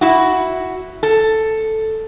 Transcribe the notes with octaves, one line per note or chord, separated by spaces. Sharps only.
E4 F#4
A4